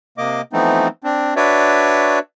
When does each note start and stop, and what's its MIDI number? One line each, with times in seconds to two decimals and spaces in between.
0.18 0.41 48
0.18 0.41 58
0.18 0.41 75
0.18 0.41 86
0.53 0.88 52
0.53 0.88 53
0.53 0.88 57
0.53 0.88 59
0.53 0.88 60
0.53 0.88 63
1.04 1.34 60
1.04 1.34 62
1.36 2.19 62
1.36 2.19 66
1.36 2.19 71
1.36 2.19 73
1.36 2.19 74
1.36 2.19 76